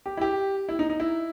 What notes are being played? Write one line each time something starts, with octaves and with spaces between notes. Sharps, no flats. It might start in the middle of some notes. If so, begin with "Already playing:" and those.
G4
E4
G4
E4
D#4
D#4
E4